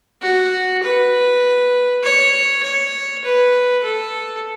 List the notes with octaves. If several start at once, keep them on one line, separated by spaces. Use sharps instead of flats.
F#4
B4
C#5
C#5
B4
A4